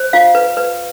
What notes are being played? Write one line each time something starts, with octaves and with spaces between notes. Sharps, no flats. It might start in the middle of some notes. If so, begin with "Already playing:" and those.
Already playing: C5
F4 F5
B4
B4